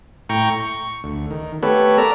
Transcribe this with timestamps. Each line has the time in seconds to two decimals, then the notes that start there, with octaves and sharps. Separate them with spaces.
0.29 A2 G5 A#5 C#6
0.60 C#6
1.04 D2
1.31 D#3
1.63 A3 B3 G4 A4 B4 C#5
1.98 A#4 D5 A5 A#5